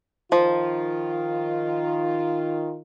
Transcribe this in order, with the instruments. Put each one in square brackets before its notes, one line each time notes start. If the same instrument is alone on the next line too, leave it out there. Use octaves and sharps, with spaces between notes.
[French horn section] D#3 F4 [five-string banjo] F3